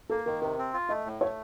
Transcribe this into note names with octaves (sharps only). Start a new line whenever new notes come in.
A#3 A4
D#3 A#4
C3 A#4
C4
F4
A3 D#5
A2
A3 C#5